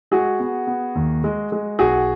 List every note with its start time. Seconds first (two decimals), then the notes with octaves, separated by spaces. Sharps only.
0.11 G#3 F#4 G#4
0.40 B3
0.67 B3
0.95 D#2
1.24 G#3
1.52 G#3
1.79 B1 F#4 G#4